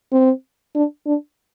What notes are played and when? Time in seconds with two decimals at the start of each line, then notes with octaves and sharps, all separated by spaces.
0.12 C4
0.75 D4
1.06 D4